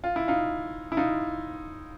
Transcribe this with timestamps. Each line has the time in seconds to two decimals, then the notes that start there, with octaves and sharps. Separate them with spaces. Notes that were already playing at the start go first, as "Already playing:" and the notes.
0.04 F4
0.16 E4
0.28 D#4 F4
0.92 E4
0.97 D#4 F4